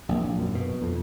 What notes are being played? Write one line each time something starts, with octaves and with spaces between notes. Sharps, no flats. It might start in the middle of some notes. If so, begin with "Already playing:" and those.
A#1
F#2
B2
F2